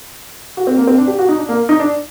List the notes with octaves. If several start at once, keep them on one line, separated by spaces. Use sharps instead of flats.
F#4
C4
A#3
C4
D4
G4
F#4
D#4
D4
A#3
D#4
D4